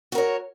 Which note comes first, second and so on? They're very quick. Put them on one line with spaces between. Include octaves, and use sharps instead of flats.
F#4 A#4 C#5